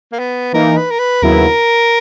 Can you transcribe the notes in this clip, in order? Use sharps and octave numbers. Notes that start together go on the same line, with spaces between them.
A#3
B3
E3 A#3 D#4 A#4
B4
A#4
B4
D#2 C#3 F#3 B3 E4 A#4